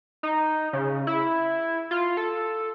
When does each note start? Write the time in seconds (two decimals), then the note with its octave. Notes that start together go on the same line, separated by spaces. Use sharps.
0.23 D#4
0.73 C#3
1.07 E4
1.91 F4
2.17 A4